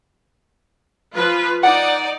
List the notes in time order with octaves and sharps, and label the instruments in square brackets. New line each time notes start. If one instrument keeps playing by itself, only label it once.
[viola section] F3 F4 B4
[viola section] D#4 D5 [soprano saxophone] F#5